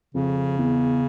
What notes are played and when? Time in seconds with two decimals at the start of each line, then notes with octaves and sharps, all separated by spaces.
0.14 F2 C#3
0.58 E2